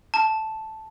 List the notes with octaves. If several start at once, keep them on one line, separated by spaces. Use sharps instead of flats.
A5